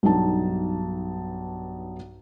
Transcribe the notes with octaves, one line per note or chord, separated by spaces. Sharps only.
B1 G2 D#4 A5